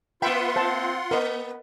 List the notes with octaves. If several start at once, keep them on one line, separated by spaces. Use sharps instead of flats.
A#3 F4 B4 E5 F#5 G5 B5 C6
C4 C5 A5
A#3 B3 A#4 D#5